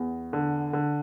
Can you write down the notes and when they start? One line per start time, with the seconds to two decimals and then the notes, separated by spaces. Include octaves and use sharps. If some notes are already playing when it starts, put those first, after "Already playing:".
Already playing: E2
0.33 D3
0.73 D3